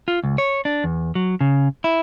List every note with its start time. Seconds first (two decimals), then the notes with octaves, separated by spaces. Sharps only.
0.08 F4
0.24 C#2
0.38 C#5
0.65 D4
0.84 E2
1.15 F#3
1.41 C#3
1.84 E4